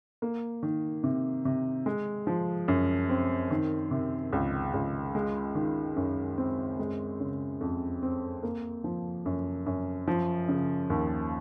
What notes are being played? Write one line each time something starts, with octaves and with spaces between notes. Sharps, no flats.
A#3
D#3
C3
C3
G#3
F3
F#2
C4
D#3
C3
C#2
C#2
G#3
D#3
F#2
C4
G#3
C#3
F2
C4
A#3
F3
F#2
F#2
F3
C#3
D#2